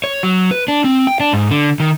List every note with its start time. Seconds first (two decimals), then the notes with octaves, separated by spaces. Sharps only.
0.04 C#5
0.23 F#3
0.51 B4
0.68 D4
0.84 C4
1.07 G5
1.20 D4
1.33 G#2
1.50 D3
1.80 D#3